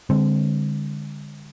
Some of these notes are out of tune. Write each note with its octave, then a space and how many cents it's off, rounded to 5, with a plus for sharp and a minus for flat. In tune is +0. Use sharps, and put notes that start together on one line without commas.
D3 +0 G#3 -35 C4 +0